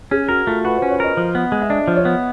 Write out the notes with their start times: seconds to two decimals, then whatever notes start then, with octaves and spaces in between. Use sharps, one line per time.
0.11 C#4 G#4
0.29 F#4 A#4
0.47 A3 F4
0.65 F#4 B4
0.78 C5
0.82 C#4
0.91 C#5
1.00 A#4 D#5
1.17 F3
1.35 B3
1.52 G#3
1.61 E5
1.70 D4 D#5
1.88 F3
1.96 C#5
2.05 B3